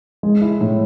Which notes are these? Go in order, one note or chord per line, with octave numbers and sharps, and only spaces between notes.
G#3
E4
A2